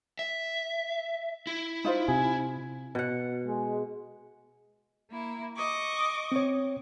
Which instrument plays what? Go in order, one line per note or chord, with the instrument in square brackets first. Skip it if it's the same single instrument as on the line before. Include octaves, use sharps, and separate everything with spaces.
[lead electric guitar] E5
E4
[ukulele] D#4 F4 C5
[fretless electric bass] C3 [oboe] G#5
[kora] B2 F#5
[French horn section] G#3
[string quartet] A#3 E4
D#5 C#6 D6
[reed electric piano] C4 C#5